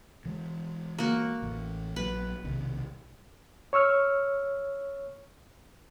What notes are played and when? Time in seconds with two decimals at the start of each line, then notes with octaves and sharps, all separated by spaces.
0.25 E3 G#3
0.98 A#3 F#4
1.42 A1 E3
1.96 A#1 F#3 B4
2.44 B1 C3 D#3
3.73 C#5 C#6 E6 F6